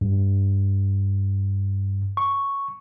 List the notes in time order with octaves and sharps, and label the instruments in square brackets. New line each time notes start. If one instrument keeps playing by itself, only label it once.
[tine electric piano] G2
C#6